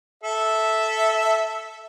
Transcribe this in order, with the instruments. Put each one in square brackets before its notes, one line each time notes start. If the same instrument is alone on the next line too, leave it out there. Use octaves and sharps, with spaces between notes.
[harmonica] A4 E5